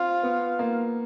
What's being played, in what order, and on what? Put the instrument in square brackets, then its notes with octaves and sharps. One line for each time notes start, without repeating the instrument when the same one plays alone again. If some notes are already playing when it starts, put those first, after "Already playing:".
Already playing: [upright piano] C4 [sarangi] F4
[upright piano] B3
A#3